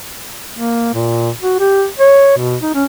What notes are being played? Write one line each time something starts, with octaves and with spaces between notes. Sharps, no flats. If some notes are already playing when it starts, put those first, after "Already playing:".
A#3
A#2
F#4
G4
C#5
B2
D#4
C#4